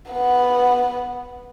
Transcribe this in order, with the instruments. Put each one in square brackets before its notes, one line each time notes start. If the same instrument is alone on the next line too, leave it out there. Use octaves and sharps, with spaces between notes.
[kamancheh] B3 F#5